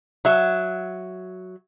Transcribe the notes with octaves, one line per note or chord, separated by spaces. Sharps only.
F#3 E5